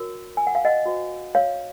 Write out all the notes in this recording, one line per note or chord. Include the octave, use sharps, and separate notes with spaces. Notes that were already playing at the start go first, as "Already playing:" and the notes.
Already playing: F#4 A#4 C#5
G#5
F#5
F5
D#5 F#5
F#4 C5
C#5 F5